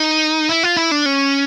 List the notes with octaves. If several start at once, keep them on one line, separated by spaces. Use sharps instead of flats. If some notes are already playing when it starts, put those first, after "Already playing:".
Already playing: D#4
E4
F4
E4
D4
C#4